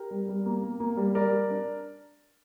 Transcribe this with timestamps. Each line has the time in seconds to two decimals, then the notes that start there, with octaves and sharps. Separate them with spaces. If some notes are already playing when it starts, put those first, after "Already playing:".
Already playing: G4 A#4
0.11 G3
0.29 G3
0.46 A#3
0.63 A#3
0.80 A#3
0.97 G3
1.15 G3 A#4 D5
1.32 G3
1.50 D4